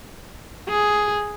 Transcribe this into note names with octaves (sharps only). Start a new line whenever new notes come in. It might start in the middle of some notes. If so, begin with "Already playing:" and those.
G#4